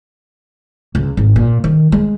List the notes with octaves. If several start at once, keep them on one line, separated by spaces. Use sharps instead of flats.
C#2
G#1
A#2
D#3
G#3